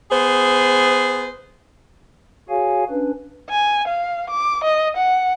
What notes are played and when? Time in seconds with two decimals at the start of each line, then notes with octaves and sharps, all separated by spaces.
0.11 B3 G#4 C5
2.49 F#4 G#4 C#5 F5 G#5
2.89 C#4 D4 B4
3.50 G#5
3.87 F5
4.30 D6
4.64 D#5
4.97 F#5